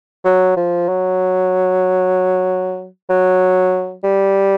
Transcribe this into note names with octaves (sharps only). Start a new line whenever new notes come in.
F#3
F3
F#3
F#3
G3